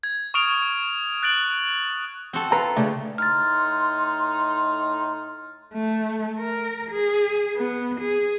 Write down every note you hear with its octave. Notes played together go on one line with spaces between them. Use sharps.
G#6
C#6 D#6 F6 D7 F7
F#6 A6 D7 F#7
C4 F#4 A4
F4 B4 A#5
C#3 A3 D4
A2 D#4 C6 F6 A6
A3
A#4
G#4
B3
G#4